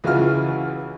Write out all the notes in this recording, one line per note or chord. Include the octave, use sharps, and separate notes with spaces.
C#2 E3 G#3 F4 F#4 F6